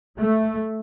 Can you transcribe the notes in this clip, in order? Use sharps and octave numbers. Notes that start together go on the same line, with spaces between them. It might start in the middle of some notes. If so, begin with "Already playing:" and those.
A3